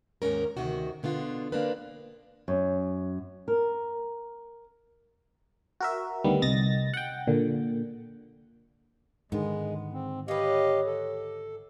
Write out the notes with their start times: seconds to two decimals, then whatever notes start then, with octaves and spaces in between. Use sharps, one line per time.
0.22 D#2 G#2 G#3 C#4 A#4
0.57 D2 C3 D#3 F#4
1.03 B2 D3 B3 F4
1.52 A#3 C4 D4 A#4 B4
2.48 F#2
3.48 A#4
5.80 F#4 A#4 E5
6.24 D2 D#3 G3 B3
6.42 C2 D#5 A6 A#6
6.94 F#5 G5
7.27 A#2 D3
9.32 G#2 D3 D#3 G#3 B3
9.93 C4
10.28 G4 B4 C#5 D#5 F5
10.86 A4